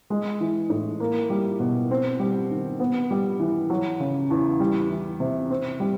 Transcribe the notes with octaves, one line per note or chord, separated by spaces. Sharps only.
G#3
E3
A2
A#3
G3
B2
C4
G3
D#3
B3
G3
E3
F#3
C#3
E2
G3
E3
C3
C4
G3